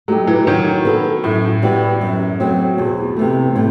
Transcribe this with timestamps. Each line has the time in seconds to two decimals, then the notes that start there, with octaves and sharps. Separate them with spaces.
0.08 F#3 A3 D#4 G4
0.27 E3
0.47 D#3 F#3
0.85 B3 F#4 A4
1.24 F#2 A2
1.62 E3 G3 B3 F#4
2.01 F#2
2.40 F#3 A3 C4
2.78 E2 B2
3.17 C3 E3 A3
3.55 A2 C3